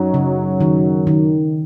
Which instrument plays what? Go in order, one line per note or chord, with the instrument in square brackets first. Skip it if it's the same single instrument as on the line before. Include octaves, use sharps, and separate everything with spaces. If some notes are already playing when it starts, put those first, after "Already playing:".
Already playing: [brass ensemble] F#2 F#3 [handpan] D#4
[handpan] C#3
D#3
D#3